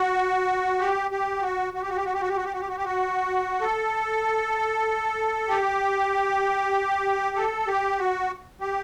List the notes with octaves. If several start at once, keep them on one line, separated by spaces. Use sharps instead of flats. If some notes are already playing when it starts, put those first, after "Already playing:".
Already playing: F#4
G4
G4
F#4
F#4
G4
F#4
G4
F#4
G4
F#4
G4
F#4
G4
F#4
G4
F#4
G4
F#4
A4
G4
A4
G4
F#4
G4